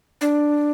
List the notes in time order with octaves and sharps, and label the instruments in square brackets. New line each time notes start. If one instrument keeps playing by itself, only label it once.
[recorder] D4